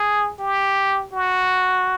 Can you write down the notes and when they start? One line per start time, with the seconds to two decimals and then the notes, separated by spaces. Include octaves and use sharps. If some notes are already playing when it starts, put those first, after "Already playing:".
Already playing: G#4
0.40 G4
1.13 F#4